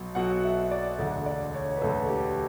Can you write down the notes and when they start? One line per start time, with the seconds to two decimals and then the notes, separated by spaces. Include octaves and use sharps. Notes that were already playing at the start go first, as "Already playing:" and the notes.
Already playing: B1 B2 F#3
0.15 B1 B2 F#3 F#5
0.44 E5
0.71 D5
0.98 E1 D2 D3
1.26 D5
1.54 C#5
1.76 B4
1.82 E1 D2 D3 A4
2.09 G4